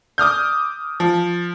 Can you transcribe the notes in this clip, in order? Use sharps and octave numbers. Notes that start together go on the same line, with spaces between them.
D6 D#6 F6 G6
F3